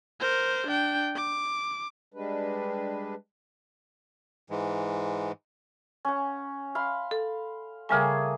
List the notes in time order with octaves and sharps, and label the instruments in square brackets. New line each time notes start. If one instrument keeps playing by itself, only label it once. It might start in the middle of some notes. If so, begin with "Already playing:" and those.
[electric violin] A#4 C5
D4 G5
D6
[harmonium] G3 G#3 D4 B4
[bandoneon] G#2 E3 G#3
[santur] C#4 F#5
F5 B5 C6
[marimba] A4
[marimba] C#3 G3 G#5 [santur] A3 A#3 G#4